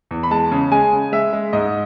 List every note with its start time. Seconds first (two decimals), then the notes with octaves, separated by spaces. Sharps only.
0.11 E2
0.23 B5
0.31 G#3 A5
0.51 C#3
0.72 G#3 G#5
0.93 C#3
1.12 G#3 E5
1.33 G#3
1.53 G#2 D#5